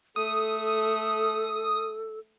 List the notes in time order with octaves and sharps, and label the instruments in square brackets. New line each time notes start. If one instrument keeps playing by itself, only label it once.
[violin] A3 [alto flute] A4 [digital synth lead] D#6